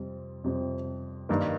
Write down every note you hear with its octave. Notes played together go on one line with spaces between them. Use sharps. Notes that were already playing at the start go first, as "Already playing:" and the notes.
Already playing: F2 C3 G3 C4
F2 C3 G3 C4
G2 D#3 A#3 D#4